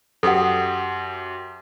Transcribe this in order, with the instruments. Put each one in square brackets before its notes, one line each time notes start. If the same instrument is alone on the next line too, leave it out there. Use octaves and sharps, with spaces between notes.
[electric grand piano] F#2 G4 [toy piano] A4 F#5